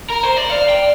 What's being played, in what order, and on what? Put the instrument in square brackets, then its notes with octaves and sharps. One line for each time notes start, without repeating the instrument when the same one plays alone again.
[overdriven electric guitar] A#4
C5
D5
[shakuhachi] D5 [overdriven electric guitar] F5
[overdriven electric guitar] G5